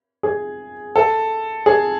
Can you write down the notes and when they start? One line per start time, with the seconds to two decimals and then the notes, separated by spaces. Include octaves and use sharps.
0.23 G#4
0.96 A4
1.66 G#4